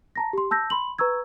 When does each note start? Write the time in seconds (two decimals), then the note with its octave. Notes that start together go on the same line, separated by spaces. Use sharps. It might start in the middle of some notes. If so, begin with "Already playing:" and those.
0.16 A5 A#5 A#6
0.33 G4 C6
0.51 A5 E6 G6 A#6
0.70 B5 C6 F#7
0.99 B4 A#5 C#6 E6 G#6